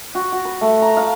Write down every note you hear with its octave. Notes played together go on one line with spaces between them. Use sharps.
F#4
F#4
B4
A3
A#5
F5